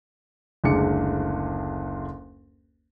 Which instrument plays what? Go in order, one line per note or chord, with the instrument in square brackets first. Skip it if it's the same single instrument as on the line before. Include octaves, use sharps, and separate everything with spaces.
[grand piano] F#1 D2 G#3 D6 C#7